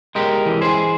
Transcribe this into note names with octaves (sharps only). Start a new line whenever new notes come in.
G#3 G4 A#4
E3
G#4 C5